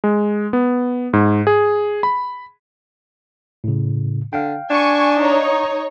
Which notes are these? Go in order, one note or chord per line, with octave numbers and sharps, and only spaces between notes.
G#3
B3
G#2
G#4
B5
A2 C#3
D3 F5 G5
D4 G#5 C#6
D#4 C#5